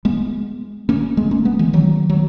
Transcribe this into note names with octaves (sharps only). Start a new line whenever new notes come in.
G#3 B3
A#3 C#4
G#3 B3
A#3 C#4
G#3 B3
E3 G#3
D#3 F#3
F#3